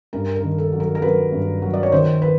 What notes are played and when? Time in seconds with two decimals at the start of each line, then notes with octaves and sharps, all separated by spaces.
0.13 G2 A#4
0.36 A#4
0.44 D#3
0.58 A4
0.72 F#3
0.80 A#4
0.95 A#4
1.02 F#3 B4
1.32 G2
1.62 F#3
1.73 D5
1.83 C#5
1.92 D#3 C5
2.22 B4